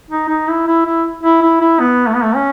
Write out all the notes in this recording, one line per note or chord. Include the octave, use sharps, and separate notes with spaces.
D#4
D#4
E4
E4
E4
E4
E4
E4
B3
A3
B3
A3
C#4